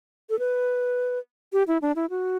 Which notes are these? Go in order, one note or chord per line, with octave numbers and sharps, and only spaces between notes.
A4
B4
G4
E4
D4
E4
F#4